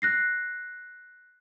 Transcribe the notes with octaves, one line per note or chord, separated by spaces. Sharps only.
F#6 A#6 C7